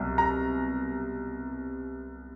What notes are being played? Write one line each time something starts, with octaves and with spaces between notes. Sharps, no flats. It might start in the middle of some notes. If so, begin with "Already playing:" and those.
Already playing: C2 B2 F#3
A#5